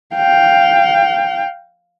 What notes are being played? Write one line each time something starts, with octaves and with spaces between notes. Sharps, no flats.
F5 G5